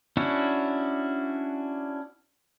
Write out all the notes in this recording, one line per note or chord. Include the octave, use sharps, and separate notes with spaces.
C#4 D4 E4 F#4